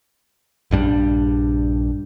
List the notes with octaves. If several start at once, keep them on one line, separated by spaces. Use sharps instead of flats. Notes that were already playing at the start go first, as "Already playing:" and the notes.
A#1 G2 G3 D4